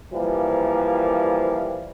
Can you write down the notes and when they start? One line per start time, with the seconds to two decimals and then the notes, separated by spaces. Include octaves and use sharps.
0.14 E3 F3 G3 A#3